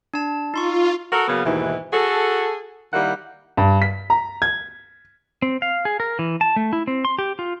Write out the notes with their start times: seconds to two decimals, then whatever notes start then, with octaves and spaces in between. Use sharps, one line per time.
0.14 D4 A5
0.54 D#4 F4 C6 C#6
1.12 F#4 A4 A#4
1.28 C#3 F#3 A#3 B3 C#4
1.44 D#2 G#2 B2 E3 E4
1.93 F#4 G#4 A4
2.93 D#3 G3 A#3 E4 F#5
3.57 G2
3.82 B6
4.10 A#5
4.42 G#6
5.42 C4
5.62 F5
5.85 G#4
6.00 A#4
6.19 E3
6.41 A5
6.56 A3
6.73 E4
6.87 C4
7.05 C6
7.19 G4
7.39 F4